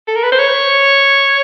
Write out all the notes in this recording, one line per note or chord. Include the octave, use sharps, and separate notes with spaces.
A4
A#4
B4
C5
C#5